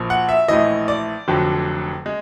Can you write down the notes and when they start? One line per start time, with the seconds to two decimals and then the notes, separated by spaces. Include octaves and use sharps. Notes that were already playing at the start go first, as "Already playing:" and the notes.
Already playing: A#1 A#2 F3
0.10 F#5
0.29 E5
0.48 A#1 A2 E3 D#5
0.88 D5
1.28 F1 F2 D3 F#3
2.06 G#3